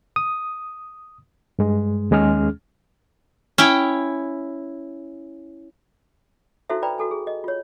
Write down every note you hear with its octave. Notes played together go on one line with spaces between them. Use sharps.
D#6
G2 G#3
D#2 G#3 C#4 G#4 F6
C#4 E4 G5
D#4 E4 F#4 A4 C5 E5
B4 D5 G5 A#5 B5
F#4 A4 G#5
G#4
D#5
F4 C#5